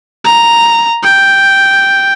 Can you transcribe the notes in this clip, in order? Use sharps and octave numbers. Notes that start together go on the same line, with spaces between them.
A#5
G5